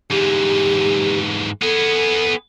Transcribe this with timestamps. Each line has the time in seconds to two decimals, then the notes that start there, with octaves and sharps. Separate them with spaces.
0.11 G#2 E3 G4
1.62 B3 G#4 A4